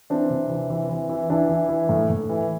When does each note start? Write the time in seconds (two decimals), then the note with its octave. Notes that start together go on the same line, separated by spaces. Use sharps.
0.10 E3 C4 D4
0.30 C3
0.50 E3
0.70 E3
0.89 E3
1.09 E3
1.30 E3 D4 E4
1.49 E3
1.69 E3
1.89 A2
2.10 A2
2.29 E3